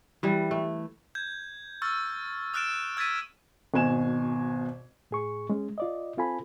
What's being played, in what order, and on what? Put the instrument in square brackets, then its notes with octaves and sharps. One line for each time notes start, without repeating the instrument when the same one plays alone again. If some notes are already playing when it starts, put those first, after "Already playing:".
[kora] E3 G3
A3
[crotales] G6 G#6
C#6 E6 F6 A6
D#6 F6 F#6 A6 D7 E7
E6 G#6 A6 B6 D#7
[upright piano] G#1 B2 G#5 E7
[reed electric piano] A2 G#4 C#6
G#3 C#4
F4 D5 D#5
C4 F4 A4 G#5 B5